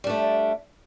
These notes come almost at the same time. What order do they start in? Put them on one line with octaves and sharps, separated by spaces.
G3 D4 A3